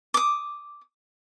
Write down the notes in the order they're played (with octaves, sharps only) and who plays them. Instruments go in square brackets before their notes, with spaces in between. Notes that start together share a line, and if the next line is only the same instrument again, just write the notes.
[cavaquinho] D6 D#6